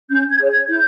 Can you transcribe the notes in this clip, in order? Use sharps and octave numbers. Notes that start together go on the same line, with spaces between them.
C#4 G6
G#6
G#4 C#5
G#6
E4 G6